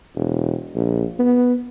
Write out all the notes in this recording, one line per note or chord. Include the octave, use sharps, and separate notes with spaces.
E1
A#1
B3